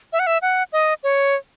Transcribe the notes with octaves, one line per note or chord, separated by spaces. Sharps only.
E5
F#5
E5
F#5
D#5
C#5